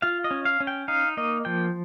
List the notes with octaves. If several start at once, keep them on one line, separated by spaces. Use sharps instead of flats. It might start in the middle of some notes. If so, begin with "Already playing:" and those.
F4 F5
D#5
C#4
F5
C#4
G5
D#4 F5
A#3 D#5
F3 G5